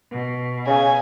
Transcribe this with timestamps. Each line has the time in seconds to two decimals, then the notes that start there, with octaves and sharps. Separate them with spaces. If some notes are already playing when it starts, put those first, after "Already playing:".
0.11 B2
0.67 C#3 G#5